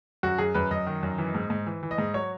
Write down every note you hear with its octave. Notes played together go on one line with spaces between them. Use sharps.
F#2 F#4
F#2 G#4
F#2 B4
F#2 D#5
D#3
F#2
E3
G#2
G#2
E3
E3
D#5
G#2
F#3 C#5